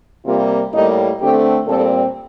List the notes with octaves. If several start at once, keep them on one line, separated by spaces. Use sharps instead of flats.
C3 G3 A#3 F4
A2 G3 A#3 D#4
D3 A3 C4 G4
A#2 G3 C4 A4